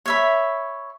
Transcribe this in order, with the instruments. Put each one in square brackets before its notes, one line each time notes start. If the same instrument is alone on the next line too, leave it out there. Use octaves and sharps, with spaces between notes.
[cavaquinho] C#5 E5 B5